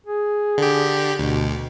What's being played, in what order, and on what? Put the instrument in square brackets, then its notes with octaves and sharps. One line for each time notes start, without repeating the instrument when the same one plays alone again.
[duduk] G#4
[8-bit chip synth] D3 G4
[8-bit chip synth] D2 [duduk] B2